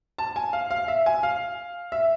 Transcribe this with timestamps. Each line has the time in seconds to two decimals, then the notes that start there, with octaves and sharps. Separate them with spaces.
0.18 A5
0.36 G#5
0.53 F5
0.71 F5
0.88 E5
1.06 G#5
1.23 F5
1.92 E5